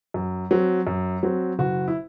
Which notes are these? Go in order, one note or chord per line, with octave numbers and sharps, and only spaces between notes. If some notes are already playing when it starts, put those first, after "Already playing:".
F#2
F#3 C4
F#2
F#3 C4
F#1 F#4
E4